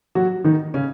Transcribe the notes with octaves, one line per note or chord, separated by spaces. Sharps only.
F#3 F#4
D#3 D#4
C#3 C#4